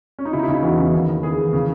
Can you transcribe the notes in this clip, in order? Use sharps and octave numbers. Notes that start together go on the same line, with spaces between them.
C#4
D#4
C#3 E4
D#4
E4
C#3
E4
E2 F#4
C#3
D#2
D#2
E3 G#4
E3
C#3